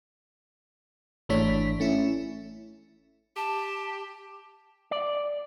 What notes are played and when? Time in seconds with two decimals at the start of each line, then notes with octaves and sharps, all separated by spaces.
1.29 G#1 E3 A3 D4 C#5 B6
1.80 A3 C#4 E4
3.36 G4 A5
4.91 D5